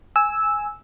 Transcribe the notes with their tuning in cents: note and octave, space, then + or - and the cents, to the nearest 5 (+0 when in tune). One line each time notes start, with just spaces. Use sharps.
G#5 +0 E6 -10